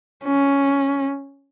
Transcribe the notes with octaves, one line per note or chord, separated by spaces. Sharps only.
C#4